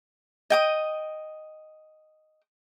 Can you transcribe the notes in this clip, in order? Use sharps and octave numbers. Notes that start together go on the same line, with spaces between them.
D#5 G5 D#6